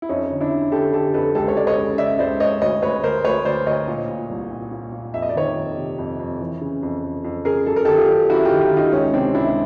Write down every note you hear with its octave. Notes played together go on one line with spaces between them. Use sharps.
E4
F2 C#4 D#4
D3
D4 E4
D3
D3 G4 A4
D3 G4 A4
F2 A4 B4
C#2 G4 A4
C#5
C#2 D5
C#5 D#5
C#3
C#3 D5 E5
C#2 C5 D5
C#2 C#5 D#5
D2 C#5 D#5
D2 B4 C#5
D2 A#4 C5
D2 B4 C#5
D2 C5 D5
D2 C#5 D#5
A#2
A#2
C2
A#2
A#2
A#2
F2 E5
D#5
D5
D#3 C#5 D#5
F2
C3
F2
F2
E3
C#3
F2
F2
F2
C#3 G#4 A#4
F#2 A4
A#4
D#3 G4 A4
F4 G4
F#2
F#2 E4 F#4
F4 G4
D#3
F4 G4
D#3
D#4 F4
C#2 C#4 D#4
C3 C4 D4
C#2 D4 E4